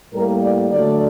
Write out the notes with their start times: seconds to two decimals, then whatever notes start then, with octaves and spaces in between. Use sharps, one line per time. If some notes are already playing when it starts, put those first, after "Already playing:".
0.13 A2 G3 A#3 A#4
0.43 D5
0.71 D3 F#3 A3 D5